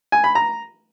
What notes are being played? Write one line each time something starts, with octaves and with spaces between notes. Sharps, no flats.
G#5
B5
A#5